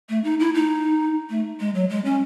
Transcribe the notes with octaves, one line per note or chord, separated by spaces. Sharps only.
A3
D#4
E4
D#4
A3
G#3
F#3
G#3
C#4